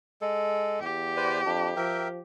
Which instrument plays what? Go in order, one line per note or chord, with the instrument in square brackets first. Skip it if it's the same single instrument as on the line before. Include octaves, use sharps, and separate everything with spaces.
[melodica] G#3 A4
[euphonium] E2 [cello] G4
[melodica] B4 C5 D5
[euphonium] F2 [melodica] D4
[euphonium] F3 [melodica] A#4 E5 G5